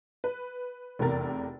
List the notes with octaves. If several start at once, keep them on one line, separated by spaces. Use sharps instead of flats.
B4
F1 E2 C3 A#4 A6